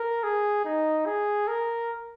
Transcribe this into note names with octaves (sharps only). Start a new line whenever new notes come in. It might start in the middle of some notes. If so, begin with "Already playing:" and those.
Already playing: A#4
G#4
D#4
G#4
A#4